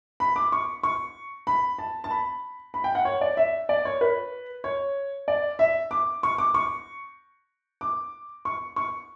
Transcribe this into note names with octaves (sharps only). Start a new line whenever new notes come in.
B5
D6
C#6
C#6
B5
A5
A5
B5
B5
G5
F#5
C#5
D5
E5
D5
C#5
B4
C#5
D5
E5
D6
C#6
D6
C#6
D6
C#6
C#6